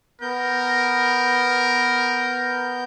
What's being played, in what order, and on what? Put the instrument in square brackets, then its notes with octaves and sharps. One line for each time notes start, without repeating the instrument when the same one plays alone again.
[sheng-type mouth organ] B3 G6 [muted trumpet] A#4